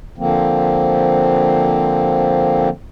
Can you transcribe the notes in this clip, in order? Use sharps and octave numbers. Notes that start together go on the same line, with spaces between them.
D3 F3 A#3 C4